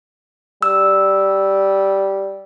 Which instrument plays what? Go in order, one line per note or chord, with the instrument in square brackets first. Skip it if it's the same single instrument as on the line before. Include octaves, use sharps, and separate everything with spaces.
[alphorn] G3 [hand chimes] E6